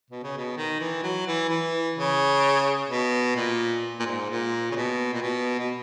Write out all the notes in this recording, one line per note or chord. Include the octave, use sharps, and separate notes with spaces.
B2
C#3
B2
D#3
E3
F#3
E3
E3
C#3
B2
A#2
A#2
G#2
A#2
C#3
B2
A#2
B2
B2